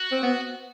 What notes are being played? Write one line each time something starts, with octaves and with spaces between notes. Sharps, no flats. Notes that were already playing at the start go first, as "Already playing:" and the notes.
Already playing: F#4
C4
B3